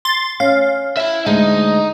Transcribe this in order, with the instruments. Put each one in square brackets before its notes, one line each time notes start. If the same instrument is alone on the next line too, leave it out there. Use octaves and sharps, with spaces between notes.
[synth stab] C6 A6
[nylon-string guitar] C#4 [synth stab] F5
[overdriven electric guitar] E4 E5
[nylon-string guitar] D2 G#3 [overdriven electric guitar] D#4